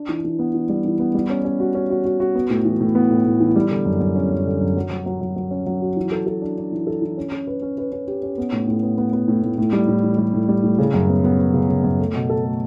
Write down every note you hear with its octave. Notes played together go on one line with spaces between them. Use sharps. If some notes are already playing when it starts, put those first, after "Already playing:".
Already playing: D4
E3
E3
B3
E3
G3
E3
B3
G3
C#4
C#4
F#4
C#4
F#4
F#4
F#4
B3
A2
E3
A2
B3
A2
A2
E3
G3
D3
F#2
F#2
C#4
F#2
D3
F#2
F#3
F#3
F#3
F#3
F#3
C#4
F#3
F#4
E3
A4
A4
D4
D4
E3
A4
E3
C#4
C#4
B4
C#4
B4
C#4
G4
C#4
B3
A2
A2
B3
B3
B3
A2
A2
A2
G3
A2
E3
G3
A2
G3
A2
C#3
F#2
B3
B3
B3
C#3
C#3
F#2
A3
B2
A4
A3